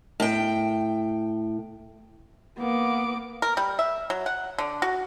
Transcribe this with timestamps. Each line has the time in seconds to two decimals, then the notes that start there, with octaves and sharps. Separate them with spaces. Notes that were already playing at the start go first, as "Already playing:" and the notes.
0.20 A2 G5
2.58 A#3 B3 D6
3.42 A#4
3.57 G3
3.79 E5
4.10 F#3
4.26 F#5
4.58 D3
4.82 F#4